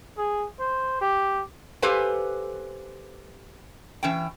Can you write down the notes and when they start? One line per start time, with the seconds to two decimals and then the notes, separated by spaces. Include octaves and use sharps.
0.18 G#4
0.60 C5
1.01 G4
1.82 G4 A4 B4 C5 F5 G#5
4.03 E3 C#4 G5